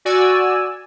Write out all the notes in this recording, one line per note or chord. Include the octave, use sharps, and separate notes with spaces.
F#4 D5 G#5 E6